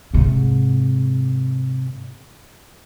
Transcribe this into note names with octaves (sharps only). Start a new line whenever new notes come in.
G#2 C3